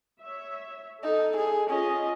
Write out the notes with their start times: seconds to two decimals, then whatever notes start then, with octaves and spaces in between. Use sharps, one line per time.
0.21 C#5 E5
1.03 D#4 A4
1.37 G#4
1.70 C#4 F4 D#5